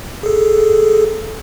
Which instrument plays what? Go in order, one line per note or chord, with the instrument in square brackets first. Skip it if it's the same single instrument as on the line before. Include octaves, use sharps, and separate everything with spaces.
[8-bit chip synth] G#4 A4